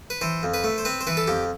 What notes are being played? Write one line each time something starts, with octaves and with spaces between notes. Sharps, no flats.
B4
E3 C5
F2
B4
A3
C5
C4 B4
C5
E3 B4
A4
F2 G4